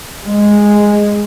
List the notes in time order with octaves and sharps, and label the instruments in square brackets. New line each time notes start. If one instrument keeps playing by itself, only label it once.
[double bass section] G#3